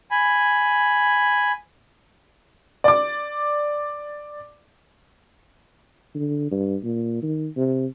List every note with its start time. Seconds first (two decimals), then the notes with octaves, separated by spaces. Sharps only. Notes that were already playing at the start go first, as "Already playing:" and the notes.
0.11 G#5 B5
2.84 D5 D6
6.15 D3
6.51 G2
6.83 A#2
7.22 D#3
7.57 C3